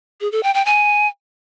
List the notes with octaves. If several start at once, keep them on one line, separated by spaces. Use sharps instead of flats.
G#4
A4
G5
G5
G#5